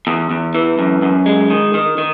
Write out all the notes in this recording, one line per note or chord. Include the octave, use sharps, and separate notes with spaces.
E2
E2
E3
F#2
F#2
G#3
D#3
D#3
D#3